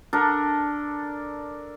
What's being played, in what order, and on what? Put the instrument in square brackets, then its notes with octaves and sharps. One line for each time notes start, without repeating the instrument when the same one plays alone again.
[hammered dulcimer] D4 A4 A#4